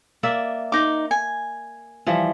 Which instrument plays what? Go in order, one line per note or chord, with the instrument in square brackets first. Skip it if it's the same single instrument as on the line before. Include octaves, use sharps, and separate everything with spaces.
[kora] A#3 D5 E5
[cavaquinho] D#4 D6
G#5
[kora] E3 F3 G3